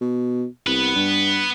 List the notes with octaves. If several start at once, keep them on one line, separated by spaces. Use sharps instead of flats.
B2
C2 B3 B4
G2